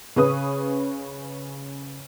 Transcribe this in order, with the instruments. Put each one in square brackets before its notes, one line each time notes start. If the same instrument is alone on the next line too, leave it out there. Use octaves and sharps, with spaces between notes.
[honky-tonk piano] C#3 C#4 B4 D#6